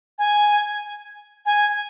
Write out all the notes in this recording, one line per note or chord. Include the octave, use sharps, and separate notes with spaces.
G#5
G#5